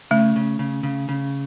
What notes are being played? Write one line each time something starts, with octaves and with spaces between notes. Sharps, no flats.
C#3 A3
C#3
C#3
C#3
C#3